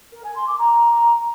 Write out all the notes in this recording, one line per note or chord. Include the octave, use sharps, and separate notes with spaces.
A#4
G#5
C6
D6
A#5